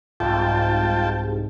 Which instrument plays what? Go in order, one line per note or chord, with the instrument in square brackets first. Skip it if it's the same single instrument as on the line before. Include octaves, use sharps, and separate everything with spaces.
[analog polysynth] C2 G#2 [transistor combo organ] F4 G5 A5